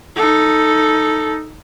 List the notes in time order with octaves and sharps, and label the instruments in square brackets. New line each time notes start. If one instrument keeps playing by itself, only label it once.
[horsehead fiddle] D#4 A4